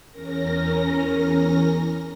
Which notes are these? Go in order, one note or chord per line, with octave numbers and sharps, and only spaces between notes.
E2 C#4 A#4 A#6